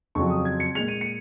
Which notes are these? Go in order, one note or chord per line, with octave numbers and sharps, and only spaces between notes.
F2 C#3 F#3 C#6
D#6
G#6
C#7
A#2 G#3 F7
D#7
C#7